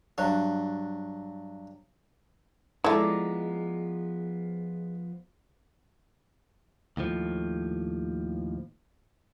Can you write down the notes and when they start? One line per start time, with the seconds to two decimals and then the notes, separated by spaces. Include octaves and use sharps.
0.18 G2 F#3
2.84 F3 G#3 B3 E4 A4 D5 A#5
6.97 D#2 A2 F3